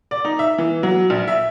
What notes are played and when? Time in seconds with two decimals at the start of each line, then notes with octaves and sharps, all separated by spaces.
0.11 D5
0.25 D#4
0.39 E5
0.58 E3
0.83 F#3
1.10 A#1
1.28 E5